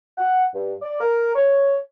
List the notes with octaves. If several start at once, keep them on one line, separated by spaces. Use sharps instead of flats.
F#5
G2
D5
A#4
C#5